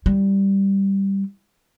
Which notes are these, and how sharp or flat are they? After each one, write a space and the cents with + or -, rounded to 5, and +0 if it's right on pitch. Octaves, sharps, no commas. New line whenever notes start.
G3 +0 E4 +0